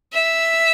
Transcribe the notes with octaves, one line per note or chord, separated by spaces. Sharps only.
E5